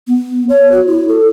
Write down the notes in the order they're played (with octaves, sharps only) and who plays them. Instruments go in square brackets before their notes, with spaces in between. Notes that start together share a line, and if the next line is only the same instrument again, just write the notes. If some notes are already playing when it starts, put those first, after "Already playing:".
[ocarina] B3
C#5
F#4
E4
A4